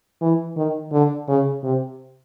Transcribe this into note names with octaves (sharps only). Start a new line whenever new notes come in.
E3
D#3
D3
C#3
C3